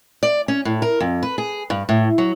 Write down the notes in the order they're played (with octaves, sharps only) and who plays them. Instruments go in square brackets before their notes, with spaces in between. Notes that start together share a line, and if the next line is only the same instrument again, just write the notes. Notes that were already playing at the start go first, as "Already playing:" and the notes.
[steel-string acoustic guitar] D5
C#4
A2
A#4
F2
B4
G#4
G2
A2
F#3